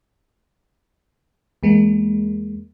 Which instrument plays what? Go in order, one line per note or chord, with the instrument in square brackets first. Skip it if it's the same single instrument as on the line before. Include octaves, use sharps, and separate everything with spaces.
[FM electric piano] E2 G#3 A#3